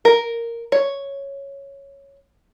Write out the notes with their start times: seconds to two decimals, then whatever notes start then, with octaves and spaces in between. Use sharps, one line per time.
0.05 A#4
0.72 C#5